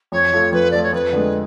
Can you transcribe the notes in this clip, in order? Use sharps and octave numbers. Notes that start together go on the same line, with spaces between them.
F2 C#5
F3 A3 F4
F2 B4
F3 A3 F4 D5
C#5
F2 B4
D3 G#3